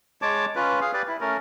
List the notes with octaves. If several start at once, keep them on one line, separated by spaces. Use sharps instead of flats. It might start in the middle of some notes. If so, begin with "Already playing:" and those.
G#3 C#5 A5 D6
C#4 F4 B4
G#4 F5
G4 B4 D5
E4
A3 C#4 A#4